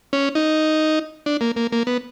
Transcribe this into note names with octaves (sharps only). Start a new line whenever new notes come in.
C#4
D#4
D4
A#3
A#3
A#3
B3